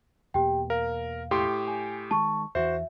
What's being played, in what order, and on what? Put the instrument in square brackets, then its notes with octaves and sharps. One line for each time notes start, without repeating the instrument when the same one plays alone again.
[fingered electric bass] E2 B2 A#3 [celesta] G4 G5
[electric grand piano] A#4 [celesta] F5
[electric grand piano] A2 G4 C6
[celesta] G#5
[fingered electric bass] D#3 G#3 [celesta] A5 C#6
[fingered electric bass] E2 E3 [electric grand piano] F#4 C5 [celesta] E5